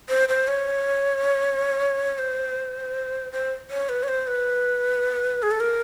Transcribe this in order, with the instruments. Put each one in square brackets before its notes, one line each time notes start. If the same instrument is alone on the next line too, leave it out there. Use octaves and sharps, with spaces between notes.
[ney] C5
C5
C#5
C5
C5
C#5
B4
C#5
C5
B4
G#4
A4
A#4